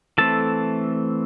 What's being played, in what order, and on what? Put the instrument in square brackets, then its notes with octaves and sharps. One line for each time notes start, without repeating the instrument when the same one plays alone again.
[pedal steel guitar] E3 A3 C4 A4 A5